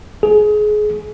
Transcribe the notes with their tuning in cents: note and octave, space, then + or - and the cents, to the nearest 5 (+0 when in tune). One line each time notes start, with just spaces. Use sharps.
G#4 +25